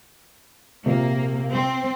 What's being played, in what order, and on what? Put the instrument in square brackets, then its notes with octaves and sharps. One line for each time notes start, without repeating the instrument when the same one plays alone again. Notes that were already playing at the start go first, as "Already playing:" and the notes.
[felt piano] A#1 C3 [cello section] A#3
[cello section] C4